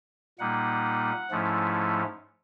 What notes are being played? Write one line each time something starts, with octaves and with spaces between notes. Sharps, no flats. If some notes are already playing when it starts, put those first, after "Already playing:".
A#2 G3 A#3 D#4 F#5
G#2 F3 A3 C#4 E4